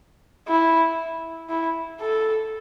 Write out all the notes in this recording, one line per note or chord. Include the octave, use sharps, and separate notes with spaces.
E4
E4
A4